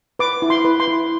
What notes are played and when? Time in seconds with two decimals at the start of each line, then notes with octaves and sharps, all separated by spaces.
0.19 B4 D6
0.42 E4
0.50 C6
0.65 B4
0.80 C6
0.87 E4